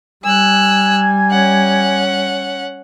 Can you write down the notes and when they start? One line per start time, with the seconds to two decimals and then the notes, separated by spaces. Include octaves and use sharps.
0.25 G3 G#5 E6 F#6
1.31 C#4 F#5